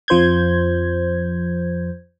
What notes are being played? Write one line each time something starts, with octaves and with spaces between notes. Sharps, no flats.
F2 F3 C5 G6 G#6